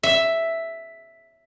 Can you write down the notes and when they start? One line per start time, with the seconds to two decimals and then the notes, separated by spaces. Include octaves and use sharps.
0.03 E5